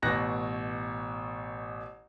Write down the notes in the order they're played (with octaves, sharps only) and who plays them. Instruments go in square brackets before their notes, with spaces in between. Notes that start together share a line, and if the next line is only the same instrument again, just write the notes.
[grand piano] A1 B2 F#6 A#6